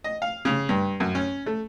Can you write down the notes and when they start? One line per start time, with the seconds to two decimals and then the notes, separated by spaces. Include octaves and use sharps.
0.04 D#5
0.22 F5
0.45 C#3
0.69 G2
1.00 F#2
1.15 C#4
1.46 A3